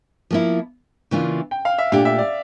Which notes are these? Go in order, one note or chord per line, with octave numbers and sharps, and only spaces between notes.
F3 A#3 E4
C#3 E3 A#3 D4 F4
G5
F5
E5
A#2 A3 D4 G4 F5
E5
D5